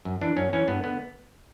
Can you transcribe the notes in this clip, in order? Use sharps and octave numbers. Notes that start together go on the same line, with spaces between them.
F#2
E3 D4
F#2 C#4
E3 C#4
G2 B3
D3 B3